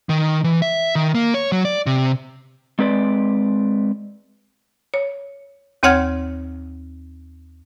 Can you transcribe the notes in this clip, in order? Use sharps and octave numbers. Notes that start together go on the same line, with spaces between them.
D#3
E3
E5
D#3
A#3
C#5
F#3
D5
C3
G#3 C4 B4 D5
C#5
D#2 C4 C#5 F#5 F6 G#6